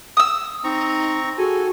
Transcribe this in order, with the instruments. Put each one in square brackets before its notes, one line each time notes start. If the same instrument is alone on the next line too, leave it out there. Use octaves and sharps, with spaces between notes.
[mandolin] D#6 E6
[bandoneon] C4 A#5 C#6 [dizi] D#4
[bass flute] F#4 [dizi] G#4 [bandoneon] A4 G#5